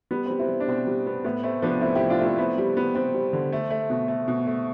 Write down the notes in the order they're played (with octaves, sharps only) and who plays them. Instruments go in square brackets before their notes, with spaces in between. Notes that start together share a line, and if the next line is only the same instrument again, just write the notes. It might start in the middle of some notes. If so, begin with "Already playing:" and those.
[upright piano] G3 B3
G3 C4
C4 E4
G3
D4
B2 C4
G3
B3
A2 B3
A3 C4
F3 B3 D4
A2 C4 E4
F3 E4 G4
D4 F4
A3
C4 E4
B3 C4 E4
G3
B3
B3 C4
G3
D3
A3
A3
B2
A3
B2
A3